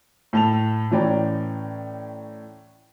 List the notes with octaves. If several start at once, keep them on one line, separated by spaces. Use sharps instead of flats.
A2 A5 F7
A2 E3 C#4 D5 G5 A#5